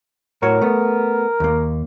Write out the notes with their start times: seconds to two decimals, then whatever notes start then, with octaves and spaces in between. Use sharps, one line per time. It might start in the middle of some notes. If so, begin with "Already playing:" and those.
0.42 A2 F#4 A#4 C#5
0.61 A3 B3
1.40 D#2 A#3